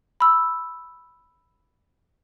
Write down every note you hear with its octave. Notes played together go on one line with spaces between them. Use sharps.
B5 E6